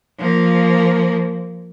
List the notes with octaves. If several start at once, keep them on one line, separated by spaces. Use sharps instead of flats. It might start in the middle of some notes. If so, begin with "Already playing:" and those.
F3 A#3